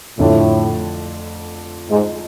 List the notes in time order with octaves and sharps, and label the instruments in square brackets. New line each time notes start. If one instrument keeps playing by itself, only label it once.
[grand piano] F2 D3 A3 D4 F4 [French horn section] A2
[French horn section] G#2